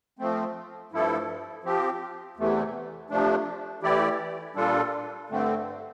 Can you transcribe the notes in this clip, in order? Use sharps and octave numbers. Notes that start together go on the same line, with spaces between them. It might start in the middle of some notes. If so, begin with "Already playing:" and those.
F3 A3 C4
G2 F3 A3 E4 A4
F3 C4 G4
E2 C3 E3 A3
C3 F3 A3 D4
E3 A3 E4 G4 D5
A#2 G3 D4 F4 A4
G2 D3 A3 C4